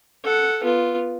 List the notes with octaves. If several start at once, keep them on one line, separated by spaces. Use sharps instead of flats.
A4 F#5
B3 F4